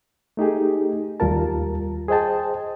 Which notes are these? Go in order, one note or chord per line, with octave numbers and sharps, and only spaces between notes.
A3 D#4 G4 G#4
D#2 G3 F4 A#4 A5
G#4 C5 D#5 G5 A5